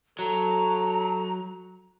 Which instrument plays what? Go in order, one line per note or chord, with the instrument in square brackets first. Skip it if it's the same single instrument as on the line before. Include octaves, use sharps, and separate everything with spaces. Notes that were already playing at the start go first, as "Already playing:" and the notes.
[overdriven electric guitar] F#3 [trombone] A4 [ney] A#5